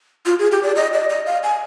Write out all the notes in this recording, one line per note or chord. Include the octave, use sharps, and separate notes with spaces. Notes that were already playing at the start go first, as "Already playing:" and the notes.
F4
G#4
G4
D5
D#5
D5
D#5
F5
G#5